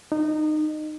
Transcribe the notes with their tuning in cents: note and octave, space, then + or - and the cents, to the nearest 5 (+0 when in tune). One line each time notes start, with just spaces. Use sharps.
D#4 -25